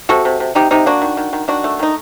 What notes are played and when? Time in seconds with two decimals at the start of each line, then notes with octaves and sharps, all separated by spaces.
0.09 C3 F#4 A4
0.25 C3
0.40 C3
0.55 C3 D#4 G4
0.71 C3 D#4 G4
0.86 A#3 D4 F#4
1.02 D#3
1.17 D#3
1.33 D#3
1.48 D#3 D4 F#4
1.64 A3
1.79 D#3 D#4